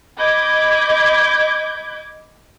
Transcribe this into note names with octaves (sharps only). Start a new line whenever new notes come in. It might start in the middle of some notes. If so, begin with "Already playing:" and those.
D#5 B5 D6 G6 G#6